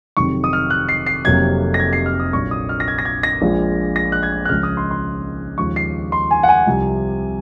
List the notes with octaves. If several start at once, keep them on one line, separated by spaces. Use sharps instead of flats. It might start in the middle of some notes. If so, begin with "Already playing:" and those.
F1 F2 C3 D#3 F#3 C#6
D#6
F6
F#6
C7
C7
F1 F2 C3 F#3 A#3 G#6
A#6
G#6
C7
F6
D#6
A#1 A#2 F#3 A#3 C#6
D#6
F6
A#6
G#6
A#6
G#6
A#6
A#1 A#2 F3 G#3
A#6
F#6
G#6
F#6
C#2 C#3 F3 F6
D#6
C6
C6
D#2 C#3 F3 G#3 C#6
C7
C6
G#5
F#5
G#5
C2 C3 F3